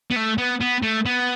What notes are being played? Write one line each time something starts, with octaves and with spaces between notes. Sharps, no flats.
B3
A3
B3
B3
A3
B3